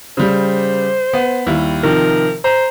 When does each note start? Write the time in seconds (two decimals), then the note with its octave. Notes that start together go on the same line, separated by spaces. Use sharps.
0.17 C#3 G3 C5
1.13 B3
1.47 D#2 G3 E4
1.83 C3 D#3 F3 A#4
2.44 C5 A#5